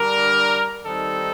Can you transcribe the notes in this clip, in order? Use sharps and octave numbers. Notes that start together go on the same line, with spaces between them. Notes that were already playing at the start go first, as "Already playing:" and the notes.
Already playing: D3 G3 D4 A#4
D#3 G3 C4 D#4 A4